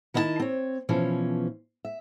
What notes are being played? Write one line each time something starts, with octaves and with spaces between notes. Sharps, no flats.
D#3 E4 D#5 E5 A5
C4 C#5
B2 E3 F3 C#4
E5